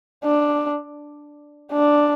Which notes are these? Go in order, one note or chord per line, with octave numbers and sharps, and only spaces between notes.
D4
D4